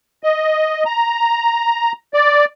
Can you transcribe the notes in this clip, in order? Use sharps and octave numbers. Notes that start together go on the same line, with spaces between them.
D#5
A#5
D5